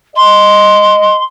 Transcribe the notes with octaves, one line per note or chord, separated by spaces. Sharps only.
D#5 C6